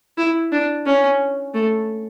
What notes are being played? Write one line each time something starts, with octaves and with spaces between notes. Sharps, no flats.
E4
D4
C#4
A3